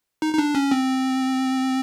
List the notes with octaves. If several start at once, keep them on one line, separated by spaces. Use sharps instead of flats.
D#4
D#4
D4
C#4
C4